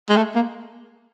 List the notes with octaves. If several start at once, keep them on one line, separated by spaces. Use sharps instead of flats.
G#3
A3
A#3